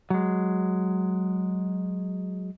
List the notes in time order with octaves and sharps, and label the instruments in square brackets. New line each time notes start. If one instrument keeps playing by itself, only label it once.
[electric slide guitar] F#3 G#3